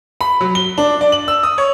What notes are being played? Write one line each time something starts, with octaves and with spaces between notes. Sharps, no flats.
B5
F#3
G7
D4
D5
F#7
E6
D#6
C#5